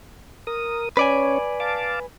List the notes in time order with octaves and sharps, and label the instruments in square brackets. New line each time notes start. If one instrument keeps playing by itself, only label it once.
[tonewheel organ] A#4 D#6
[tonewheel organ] C#4 C#5 [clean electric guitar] B4 D5 G#5
[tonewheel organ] F5 A5 D6